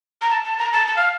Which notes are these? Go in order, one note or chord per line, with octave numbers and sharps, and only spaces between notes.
A#5
A5
A5
A#5
A5
A5
F5